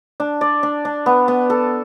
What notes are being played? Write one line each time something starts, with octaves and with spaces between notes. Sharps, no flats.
D4
D5
D4
D4
B3
B3
A4